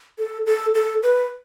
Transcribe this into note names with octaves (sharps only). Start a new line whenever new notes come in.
A4
A4
A4
B4